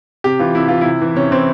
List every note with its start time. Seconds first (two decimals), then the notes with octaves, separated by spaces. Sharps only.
0.24 C3 G4
0.39 E3 F4
0.55 C3 E4
0.68 E3 F4
0.81 C3 E4
1.01 E3
1.16 C3 C#4
1.31 E3 C4